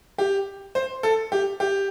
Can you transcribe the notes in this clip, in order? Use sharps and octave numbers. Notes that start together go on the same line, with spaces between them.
G4
C5
A4
G4
G4